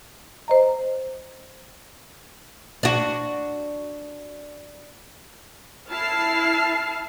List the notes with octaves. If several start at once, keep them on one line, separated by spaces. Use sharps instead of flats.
C5 D#5 A#5
D4 F#4
E4 A5 F6 C7